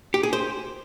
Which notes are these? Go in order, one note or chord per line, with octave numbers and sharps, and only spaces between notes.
G4
G#4
C5